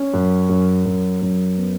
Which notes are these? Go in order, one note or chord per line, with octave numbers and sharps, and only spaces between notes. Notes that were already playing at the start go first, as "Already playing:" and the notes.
Already playing: C#4
F#2
F#2
F#2
F#2
B3